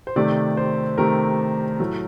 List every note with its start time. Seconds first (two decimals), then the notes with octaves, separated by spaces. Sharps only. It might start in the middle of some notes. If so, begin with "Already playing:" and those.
0.07 C5
0.16 C3 D#3 A3 D5
0.57 C5
0.98 C3 D#3 A3 A#4
1.80 A2 F#3 A3